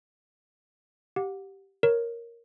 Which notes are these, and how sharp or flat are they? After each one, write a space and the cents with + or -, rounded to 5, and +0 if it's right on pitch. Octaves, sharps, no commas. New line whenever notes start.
G4 -10 F#5 -35
A#4 +0 C#5 +0